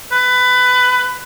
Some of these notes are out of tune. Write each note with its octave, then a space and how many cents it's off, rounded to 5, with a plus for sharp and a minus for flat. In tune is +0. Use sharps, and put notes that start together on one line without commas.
B4 +20